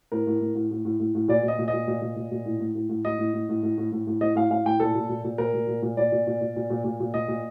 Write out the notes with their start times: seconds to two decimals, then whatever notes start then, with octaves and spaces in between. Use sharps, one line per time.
0.12 A2 A#4
0.27 A2
0.41 A2
0.55 A2
0.71 A2
0.85 A2
1.00 A2
1.15 A2
1.28 A#2 D5
1.43 A#2
1.48 D#5
1.59 A#2
1.68 D#5
1.73 A#2
1.88 A#2
2.01 A#2
2.16 A#2
2.32 A#2
2.45 A2
2.60 A2
2.75 A2
2.89 A2
3.05 A2 D#5
3.19 A2
3.34 A2
3.49 A2
3.63 A2
3.78 A2
3.92 A2
4.07 A2
4.21 A2 D#5
4.36 A2 F5
4.50 A2 F5
4.65 A2 G5
4.80 A#2 A4
4.95 A#2
5.09 A#2
5.24 A#2
5.38 A#2 A#4
5.54 A#2
5.68 A#2
5.82 A#2
5.97 A#2 D5
6.12 A#2
6.27 A#2
6.41 A#2
6.56 A#2
6.70 A#2
6.84 A#2
7.00 A#2
7.14 A#2 D#5
7.28 A#2